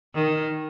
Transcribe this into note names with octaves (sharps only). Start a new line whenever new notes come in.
D#3